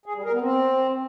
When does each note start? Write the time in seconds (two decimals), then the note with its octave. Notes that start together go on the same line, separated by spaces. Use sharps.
0.06 G#4
0.15 G3
0.24 A#4
0.33 B3
0.42 C4